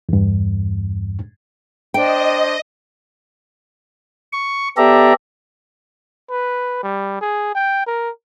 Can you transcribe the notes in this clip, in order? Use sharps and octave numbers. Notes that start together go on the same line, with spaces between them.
E2 G2
D4 C5 D#5 G5
C#6
B3 G4 A4 D5 E5 A#5
B4
G3
G#4
G5
A#4